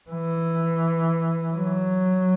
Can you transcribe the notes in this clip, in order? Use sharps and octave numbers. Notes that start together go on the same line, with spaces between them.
E3
F#3